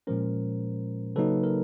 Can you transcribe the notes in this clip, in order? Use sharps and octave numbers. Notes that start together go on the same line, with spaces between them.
A#2 F3 G#3 C#4 A#4 C5
C#3 F#3 A#3 D#4 A4 B4
A#4